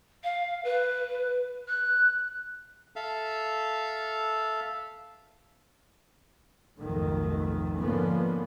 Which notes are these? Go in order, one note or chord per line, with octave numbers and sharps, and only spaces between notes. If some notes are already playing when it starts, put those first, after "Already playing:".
F5
B4
F#6
A4 E5 F5
F1 B1 F2 G#2 D#3 A3
G#2 D3 F3 A#3 B3 C#4